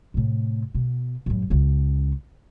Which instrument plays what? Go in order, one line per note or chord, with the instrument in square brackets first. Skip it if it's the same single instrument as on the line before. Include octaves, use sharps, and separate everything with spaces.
[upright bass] A2 C3
B2
A1 F#2
C#2 C#4